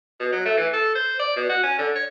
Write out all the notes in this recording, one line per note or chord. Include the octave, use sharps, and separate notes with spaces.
B2
F#3
A3
E3
A4
C5
D5
B2
F#4
C#4
D3
C#5